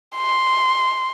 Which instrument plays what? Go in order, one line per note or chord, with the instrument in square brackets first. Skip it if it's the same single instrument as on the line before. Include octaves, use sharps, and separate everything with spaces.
[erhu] C6